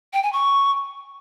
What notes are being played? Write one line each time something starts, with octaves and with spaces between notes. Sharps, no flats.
G5
G#5
C#6